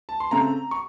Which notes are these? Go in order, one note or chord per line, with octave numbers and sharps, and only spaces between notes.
A5
C6
C#3 A3 C4 A#5
C#6